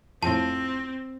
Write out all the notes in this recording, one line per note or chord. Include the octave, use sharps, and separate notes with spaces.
F2 A2 C4 A5